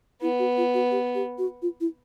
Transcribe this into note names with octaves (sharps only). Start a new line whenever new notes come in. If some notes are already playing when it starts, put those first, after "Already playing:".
B3 E4
F#4
F4
F#4
G4
G4
F#4
F4
E4